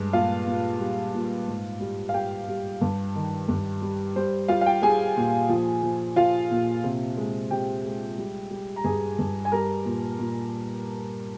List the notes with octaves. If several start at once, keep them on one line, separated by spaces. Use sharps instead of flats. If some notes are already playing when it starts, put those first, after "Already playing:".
Already playing: G2 G#3
A#2 F4 F5
A#2
G3
A#2
G#2
G3
F5
G3 G4 G5
G3
G2
D#3
G2
G3
G3 C5
G3 F4 F5
F5
G4 G5
G3 G#4 G#5
A#2
F3
F3
F3 F4 F5
A#2
C3
G#3
C3 G4 G5
G#3
G3
G3
A#5
G2 G#4 G#5
G2
G#5
G3 A#4 A#5
A#2
A#2